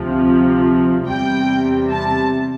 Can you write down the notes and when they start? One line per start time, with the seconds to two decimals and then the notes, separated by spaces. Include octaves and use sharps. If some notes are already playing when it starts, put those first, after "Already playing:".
Already playing: D2 C3 F3
1.06 E2 C3 G3 G5
1.91 A5